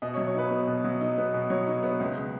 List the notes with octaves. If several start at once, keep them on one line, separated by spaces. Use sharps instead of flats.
B2 D#5
C#5
F#3
C#5
D#4 B4
B3
B2
F#3
D#4
B3
B2
F#3 C#5
D#4
B3
C#2
C#3